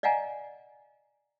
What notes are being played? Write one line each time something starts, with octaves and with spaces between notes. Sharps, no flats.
D5 D#5 F5 F#5 G#5 A#5